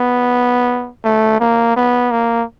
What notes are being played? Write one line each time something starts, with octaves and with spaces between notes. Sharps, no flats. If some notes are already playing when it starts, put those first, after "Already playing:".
Already playing: B3
A3
A#3
B3
A#3